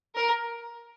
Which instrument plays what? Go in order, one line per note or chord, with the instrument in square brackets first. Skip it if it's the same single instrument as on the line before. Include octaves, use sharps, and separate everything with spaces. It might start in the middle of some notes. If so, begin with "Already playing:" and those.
[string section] A#4